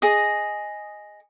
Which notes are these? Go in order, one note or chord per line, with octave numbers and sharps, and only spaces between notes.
G#4 D#5